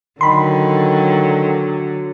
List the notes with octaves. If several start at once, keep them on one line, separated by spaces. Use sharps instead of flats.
D3 D#3 F#3 B5 C6